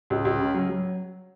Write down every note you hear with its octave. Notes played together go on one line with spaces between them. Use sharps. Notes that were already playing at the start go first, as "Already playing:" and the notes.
C#2
C#2
C#3
F#3
F#3